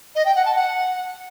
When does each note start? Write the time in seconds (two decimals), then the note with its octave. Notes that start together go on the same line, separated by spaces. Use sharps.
0.15 D#5
0.25 G5
0.35 F#5
0.45 A5
0.55 F#5